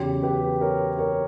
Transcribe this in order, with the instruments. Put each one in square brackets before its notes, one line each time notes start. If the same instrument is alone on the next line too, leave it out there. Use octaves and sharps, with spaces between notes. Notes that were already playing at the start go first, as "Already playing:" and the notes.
Already playing: [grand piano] E2 C#3 F#3 G4
G4 B4
A#4 C#5
A#4 C#5